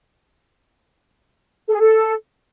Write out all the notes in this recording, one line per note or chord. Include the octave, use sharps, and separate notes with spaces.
A4
G#4
A4